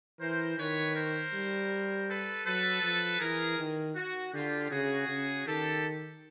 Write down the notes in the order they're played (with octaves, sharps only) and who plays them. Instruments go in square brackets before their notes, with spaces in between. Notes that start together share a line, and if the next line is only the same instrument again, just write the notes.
[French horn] E3 [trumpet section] A#4 C5
[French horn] D#3 [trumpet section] B4 C#5
[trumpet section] A#4 C5
[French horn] G3
[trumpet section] A4 B4
[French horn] F#3 [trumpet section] A4 B4
[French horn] F3
[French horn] E3 [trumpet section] G#4 A#4
[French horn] D#3
[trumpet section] F#4
[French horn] D3 [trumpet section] F4 G4
[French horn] C#3 [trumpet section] F#4 G#4
[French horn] C#3
[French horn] D#3 [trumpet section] G4 A4